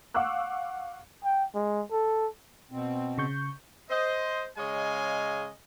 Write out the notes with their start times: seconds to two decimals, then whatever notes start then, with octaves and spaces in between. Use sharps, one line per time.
0.14 F5 F#5 C#6 D6 E6 F#6
1.24 G5
1.55 G#3
1.91 A4
2.71 B2 C4
3.18 C#3 C#6 G6
3.90 C5 D#5
4.57 C#3 G#3 C#5 D#5 F5 G#5